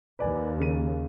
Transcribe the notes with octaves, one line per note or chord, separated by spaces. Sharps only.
D#2 B4 D5 G#5
C#3 D#7